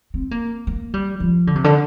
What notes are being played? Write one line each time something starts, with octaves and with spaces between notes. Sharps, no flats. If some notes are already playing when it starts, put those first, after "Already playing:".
C4
A#3
A#3
G3
F3
D3
C3
D3